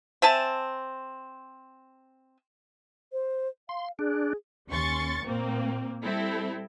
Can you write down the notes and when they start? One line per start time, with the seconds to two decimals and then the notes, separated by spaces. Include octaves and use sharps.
0.22 C4 E5 G#5 A5
3.13 C5
3.69 F5 C6
3.99 D4 G#4
4.69 D#2 C#4 C6 C#6 A6
5.24 A#2 A#3 C4
6.03 G3 C4 E4 A4